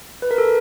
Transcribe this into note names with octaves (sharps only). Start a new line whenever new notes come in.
B4
A#4
A4